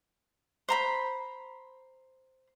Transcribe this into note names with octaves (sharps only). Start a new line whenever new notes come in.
C5 A#5 B5